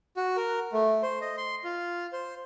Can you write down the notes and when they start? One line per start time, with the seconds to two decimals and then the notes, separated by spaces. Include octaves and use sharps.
0.17 F#4
0.37 A#4
0.73 A3
1.03 C5
1.21 D#5
1.37 C6
1.64 F4
2.13 C5